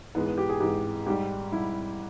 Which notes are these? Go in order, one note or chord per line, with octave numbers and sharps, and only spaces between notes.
G#2 E3 G#3 B3
B3
G4
G#4
G#2 E3 G#3 G4
G#2 G3 G4
G#2 G3 E4